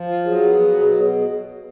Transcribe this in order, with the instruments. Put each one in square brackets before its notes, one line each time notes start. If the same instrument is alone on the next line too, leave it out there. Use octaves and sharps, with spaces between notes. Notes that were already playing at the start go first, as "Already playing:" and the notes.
Already playing: [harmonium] F3
F4
[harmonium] F#3 [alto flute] G#4
[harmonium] B3
F#3
B2
B2